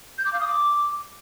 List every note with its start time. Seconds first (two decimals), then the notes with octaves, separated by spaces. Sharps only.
0.18 G6
0.26 D6
0.33 F5
0.40 D#6
0.48 D6